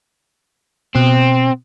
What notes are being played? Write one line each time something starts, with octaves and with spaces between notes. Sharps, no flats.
B2 C4